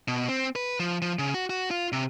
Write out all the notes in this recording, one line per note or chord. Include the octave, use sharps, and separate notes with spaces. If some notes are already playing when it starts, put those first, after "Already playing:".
B2
C4
B4
F3
F3
C#3
F#4
F#4
F4
C3